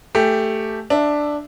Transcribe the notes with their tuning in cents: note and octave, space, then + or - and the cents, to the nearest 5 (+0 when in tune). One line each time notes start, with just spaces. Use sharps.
A3 +5 G4 +0 G#5 +0
D4 +5 E5 +0